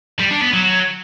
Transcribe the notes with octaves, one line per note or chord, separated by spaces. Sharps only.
G3
D4
B3
F#3